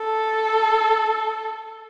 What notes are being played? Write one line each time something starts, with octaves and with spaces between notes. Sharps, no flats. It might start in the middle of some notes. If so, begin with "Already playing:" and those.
Already playing: A4